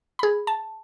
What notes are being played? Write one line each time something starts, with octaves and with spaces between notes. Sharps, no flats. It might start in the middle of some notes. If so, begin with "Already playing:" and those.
G#4 B5
A5